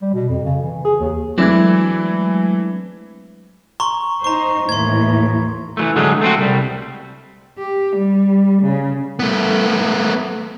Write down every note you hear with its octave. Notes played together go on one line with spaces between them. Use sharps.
G3
B2
F2
C#3
E3
G#4
D#2
E3 F#3 G#3 A3 C4 D4 E4 G#6
A#5 C6 C#6
D#4 C5 A#5 C#6
D#2 A2 E3 C6 G#6
E3 F#3 A3
D3 F#3 G#3 A3
A3 C4 F#4
C2 G3
G4
G3
C#3
A3 B3